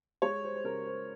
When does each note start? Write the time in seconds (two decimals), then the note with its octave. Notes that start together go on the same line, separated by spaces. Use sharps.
0.22 G#3 C#5
0.44 C5
0.56 C5
0.64 C#3 A#4
0.86 C5